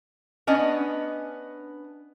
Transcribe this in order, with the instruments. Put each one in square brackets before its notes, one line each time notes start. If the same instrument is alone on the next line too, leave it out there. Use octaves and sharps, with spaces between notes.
[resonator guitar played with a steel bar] B3 C#4 D4 D#5